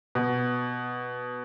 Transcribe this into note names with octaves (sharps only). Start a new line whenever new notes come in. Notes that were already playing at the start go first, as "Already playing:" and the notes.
B2